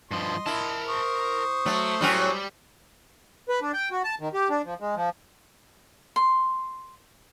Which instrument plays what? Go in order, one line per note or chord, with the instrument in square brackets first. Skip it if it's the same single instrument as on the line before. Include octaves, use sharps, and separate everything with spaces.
[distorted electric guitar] G2 F3 [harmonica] D#5 C6
[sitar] E4 [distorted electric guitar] A#4 A5
[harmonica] C5 C#6 D#6
[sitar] F#3 [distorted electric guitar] A3
[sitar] A2 F#3 C#4 [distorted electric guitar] G3
[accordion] B4
D4
G5
F#4
A5
D#3
G4
D4
F3
G#3
F3
[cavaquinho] C6